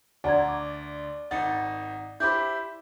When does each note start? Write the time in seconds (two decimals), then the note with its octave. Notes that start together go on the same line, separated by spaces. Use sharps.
0.24 D2 D5 F#5 A#5 G#6
0.48 D6
1.31 G#1 D#4 F#5 A6 C#7
2.20 E4 G4 C5 B5 D6 G6